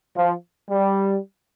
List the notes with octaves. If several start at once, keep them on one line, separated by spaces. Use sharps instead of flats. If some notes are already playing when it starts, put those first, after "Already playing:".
F3
G3